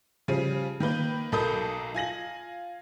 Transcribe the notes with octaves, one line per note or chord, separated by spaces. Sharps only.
C#3 F3 G3 C7 D#7
D#3 A#3 B4 G6
B1 A4 A#4 B5 D#6 G6
F4 G#5 A#6 F#7